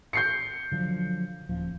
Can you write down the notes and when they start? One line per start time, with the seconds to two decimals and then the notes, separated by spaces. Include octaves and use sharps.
0.13 G6 C7 C#7
0.72 D3 F3 F#3
1.49 D#1 F3